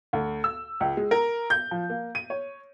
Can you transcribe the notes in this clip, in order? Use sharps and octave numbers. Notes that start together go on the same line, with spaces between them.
D2
E6
C#2
G#3
A#4
G6
F3
A#3
D#7
C#5